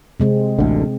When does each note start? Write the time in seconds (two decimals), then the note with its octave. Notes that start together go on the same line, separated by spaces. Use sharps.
0.20 C3 G#3 C4
0.59 A1 D2 D3